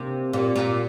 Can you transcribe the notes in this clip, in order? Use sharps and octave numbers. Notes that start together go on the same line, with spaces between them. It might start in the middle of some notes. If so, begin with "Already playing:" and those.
Already playing: C3 A#3 D4 G4 A#4
A#2 G4 D5 F5
A#2